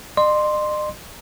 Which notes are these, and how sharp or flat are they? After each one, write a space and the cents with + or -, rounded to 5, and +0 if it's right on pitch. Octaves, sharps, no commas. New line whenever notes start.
D#5 -45 C6 +0